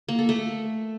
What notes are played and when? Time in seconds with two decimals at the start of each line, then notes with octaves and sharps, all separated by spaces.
0.08 A#3
0.19 A4
0.29 A3